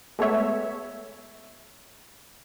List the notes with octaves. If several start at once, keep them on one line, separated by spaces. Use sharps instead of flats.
G#3 A3 B3 C#5 E5